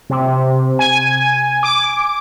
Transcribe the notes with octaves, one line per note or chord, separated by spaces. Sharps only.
C3
G#5
D6